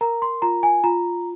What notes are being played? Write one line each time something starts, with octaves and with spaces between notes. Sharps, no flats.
A#4 A#5
C6
F4 A#5
G#5
F4 A#5